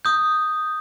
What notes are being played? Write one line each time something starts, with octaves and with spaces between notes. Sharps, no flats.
D#6 G6